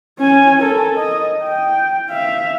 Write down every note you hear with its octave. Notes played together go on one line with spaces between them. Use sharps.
C#4 G#5
A4 A#4
D#5
G5
E5 F5